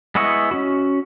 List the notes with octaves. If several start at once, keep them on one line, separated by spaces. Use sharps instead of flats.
G#3 B3 E4 D#5 C#6
C#4 F#4